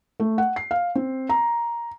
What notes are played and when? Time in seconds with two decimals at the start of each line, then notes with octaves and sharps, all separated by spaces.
0.20 A3
0.38 F#5
0.56 C7
0.71 F5
0.95 C4
1.29 A#5